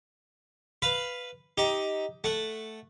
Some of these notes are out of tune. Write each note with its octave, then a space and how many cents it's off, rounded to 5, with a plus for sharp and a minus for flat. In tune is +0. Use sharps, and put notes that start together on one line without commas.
B4 +0 F5 +0 B5 +0
D#4 +10 G4 +0
A3 +0 F#5 +0